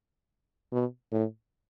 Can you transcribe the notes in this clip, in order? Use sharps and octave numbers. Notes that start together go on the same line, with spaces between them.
B2
A2